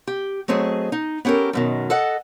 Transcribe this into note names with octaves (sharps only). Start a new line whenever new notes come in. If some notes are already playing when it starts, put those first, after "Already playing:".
G4
F#3 A3 C4 G#4 D#5
D#4
B3 C#4 G4 A4 A#4
F#2 B2 D#3
A4 D#5 F#5